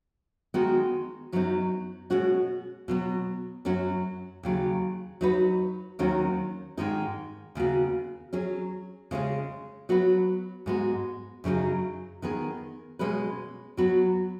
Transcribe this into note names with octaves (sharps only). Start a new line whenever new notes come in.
D#3 G#3 B3 D#4 F#4
F#2 F#3 B3 D#4
B2 G#3 C#4 F#4
B2 F#3 B3
F#2 F#3 C#4 F#4
D#2 C#3 F#3
F#3 D#4 F#4 B4
D#2 D#3 F#3 C#4 F#4
G#2 D#3 G#3 D#4 G#4
D#2 C#3 B3 F#4
F#3 C#4 G#4
C#3 G#3 C#4 G#4
F#3 B3 F#4 B4
G#2 G#3 B3 F#4
F#2 C#3 F#3 D#4 G#4
D#3 B3 G#4
B2 G#3 C#4 G#4 B4
F#3 B3 F#4 B4